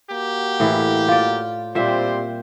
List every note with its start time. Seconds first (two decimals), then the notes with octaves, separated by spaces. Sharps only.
0.10 A#3 F#4 G4
0.60 A2 E3
1.08 F4 D5
1.75 A#2 G3 C4 C5 E5